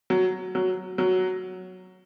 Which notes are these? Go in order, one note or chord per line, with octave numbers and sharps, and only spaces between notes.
F#3
F#3
F#3